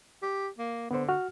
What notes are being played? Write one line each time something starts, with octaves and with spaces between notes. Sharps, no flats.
G4
A#3
D3 B3 C5
F#4 F6